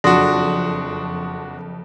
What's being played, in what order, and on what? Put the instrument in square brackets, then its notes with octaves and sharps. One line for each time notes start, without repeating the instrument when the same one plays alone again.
[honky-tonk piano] F#1 F2 [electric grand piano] D4 F#4 [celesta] C6 D#6 A#6